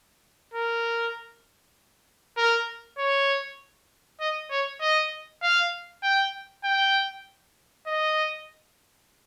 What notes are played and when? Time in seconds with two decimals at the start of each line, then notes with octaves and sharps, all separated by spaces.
0.54 A#4
2.37 A#4
2.99 C#5
4.21 D#5
4.51 C#5
4.81 D#5
5.43 F5
6.04 G5
6.64 G5
7.87 D#5